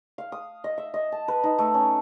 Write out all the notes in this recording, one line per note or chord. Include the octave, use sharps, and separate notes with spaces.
F5
D#6
D#5
E5
D#5
A5
B4
D#4
A3
C#4